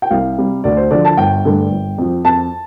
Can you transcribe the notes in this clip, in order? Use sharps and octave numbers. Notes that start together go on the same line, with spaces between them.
G5
C2 F5
C3 G3
D2 D5
C5
D3 F3 D5
A5
G1 G5
G2 D3 A3
G1
F2 F3
F2 A5